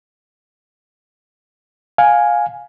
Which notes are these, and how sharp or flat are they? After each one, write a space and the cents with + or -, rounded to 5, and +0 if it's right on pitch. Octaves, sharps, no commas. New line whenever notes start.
F5 +15 G#5 +0